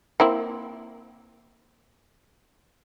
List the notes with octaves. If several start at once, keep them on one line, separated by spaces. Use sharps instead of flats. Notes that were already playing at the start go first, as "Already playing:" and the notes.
A#3 C4 E4